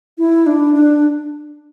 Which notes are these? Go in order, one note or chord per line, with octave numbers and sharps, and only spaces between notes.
E4
D4
D4